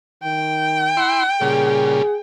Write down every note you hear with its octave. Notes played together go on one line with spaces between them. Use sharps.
D#3 G5
E4 C6
A#2 C#3 G3 G#4